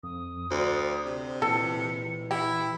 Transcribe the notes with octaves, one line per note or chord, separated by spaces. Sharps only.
F2 D#6
D2 C5 D5
C3
A#2 E3 A4 C#7
E4 G4 E6